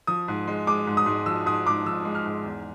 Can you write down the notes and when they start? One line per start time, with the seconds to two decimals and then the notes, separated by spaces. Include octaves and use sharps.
0.07 F3 D#6
0.28 G#2
0.47 G#3
0.67 G#3 D6
0.87 G#2
0.97 D#6
1.06 G#2
1.26 F3 E6
1.46 G#2 D#6
1.66 G#2 D6
1.86 F3 E6
2.05 G#3
2.15 F6
2.26 G#2
2.45 E2